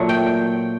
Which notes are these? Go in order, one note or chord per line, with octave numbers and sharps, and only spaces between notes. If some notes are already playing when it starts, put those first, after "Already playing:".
Already playing: A#2 F#3 A3
G5